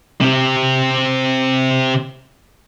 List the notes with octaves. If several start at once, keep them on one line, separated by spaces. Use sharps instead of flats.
C3 C4